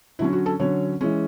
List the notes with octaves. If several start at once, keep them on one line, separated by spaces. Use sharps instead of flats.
D3 F#3 C#4 E4
F#4
A4
D3 F#3 C#4 C#5
E3 G#3 C#4